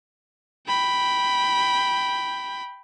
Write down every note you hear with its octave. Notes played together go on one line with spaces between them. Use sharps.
G5 B5